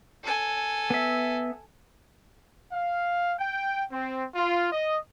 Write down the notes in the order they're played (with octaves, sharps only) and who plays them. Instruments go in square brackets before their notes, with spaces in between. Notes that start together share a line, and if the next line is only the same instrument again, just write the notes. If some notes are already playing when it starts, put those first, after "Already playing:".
[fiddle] A4 G#5
[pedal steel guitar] B3 E5
[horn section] F5
G5
C4
F4
D#5